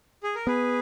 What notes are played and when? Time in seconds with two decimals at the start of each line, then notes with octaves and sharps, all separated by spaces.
0.23 G#4
0.35 A#4
0.47 B3 G#4 B4